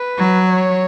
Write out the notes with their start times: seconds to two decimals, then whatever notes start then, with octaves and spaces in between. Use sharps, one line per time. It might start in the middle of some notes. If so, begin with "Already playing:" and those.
Already playing: B4
0.18 F#3
0.50 C#5